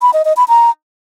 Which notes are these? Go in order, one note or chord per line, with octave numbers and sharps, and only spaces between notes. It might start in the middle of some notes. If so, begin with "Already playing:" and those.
B5
D#5
D#5
B5
A#5